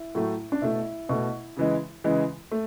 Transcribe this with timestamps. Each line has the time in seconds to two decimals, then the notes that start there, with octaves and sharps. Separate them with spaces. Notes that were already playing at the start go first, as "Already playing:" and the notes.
Already playing: E4
0.15 A2 F#3 A3
0.52 D4
0.62 B2 A3 E4
1.09 B2 A3
1.56 C#3 E3 G#3
2.04 C#3 E3 G#3
2.52 A3